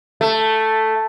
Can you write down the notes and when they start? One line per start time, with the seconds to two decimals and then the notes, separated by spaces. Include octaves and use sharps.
0.21 A3